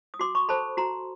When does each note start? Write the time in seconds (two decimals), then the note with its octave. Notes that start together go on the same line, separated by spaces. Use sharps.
0.14 D#6
0.19 F#4 C6 D6
0.35 B5 C#6
0.49 A4 C5 A5 B5
0.77 F#4 A#5 C6